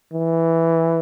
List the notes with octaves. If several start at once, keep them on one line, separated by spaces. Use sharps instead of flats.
E3